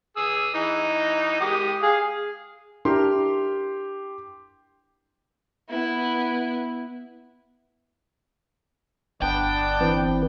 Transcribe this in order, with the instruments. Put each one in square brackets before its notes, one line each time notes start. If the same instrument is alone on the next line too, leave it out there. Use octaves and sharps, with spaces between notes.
[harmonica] G#4 D#6 E6
E3 D#4
G#3 G4 D#6
[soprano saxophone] G#4 [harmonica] F5
[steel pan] D4 E4 A#4 [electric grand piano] G4 C6
[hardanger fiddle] B3 E4
[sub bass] G1 [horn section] B3 D4 [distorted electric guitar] G5
[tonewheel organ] E3 C4 B4